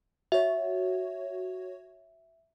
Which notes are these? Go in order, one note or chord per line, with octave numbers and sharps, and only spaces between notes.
F#4 C#5 E5